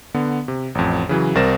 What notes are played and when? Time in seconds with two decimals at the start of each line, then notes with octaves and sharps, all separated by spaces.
0.14 D3 B3
0.48 C3
0.75 A1 F2
1.09 C#3 E3 F#3
1.35 C2 C4 A#4 A6 A#6 E7